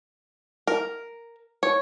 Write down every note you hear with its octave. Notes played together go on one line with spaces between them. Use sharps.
A#4
C#5